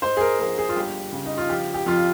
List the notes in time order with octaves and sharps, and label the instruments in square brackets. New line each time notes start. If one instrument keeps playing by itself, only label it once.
[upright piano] G#2 C5
G#4
A#4
A#1 A#4
G#4
F4
G1 G4
C#3
D#4
F4
F3 G4
G4
F2 F4